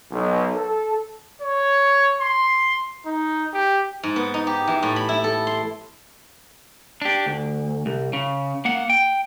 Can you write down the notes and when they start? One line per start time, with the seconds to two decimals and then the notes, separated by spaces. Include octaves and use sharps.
0.11 B1
0.56 A4
1.42 C#5
2.21 C6
3.06 D#4
3.54 G4
4.03 G#2
4.16 B3
4.34 D#4
4.47 G4
4.68 E3
4.83 A2
4.96 B5
5.09 E4
5.24 A4
5.47 C6
7.02 D4 G4
7.26 D2
7.86 C2
8.13 C#3
8.65 A#3 F#5
8.90 G5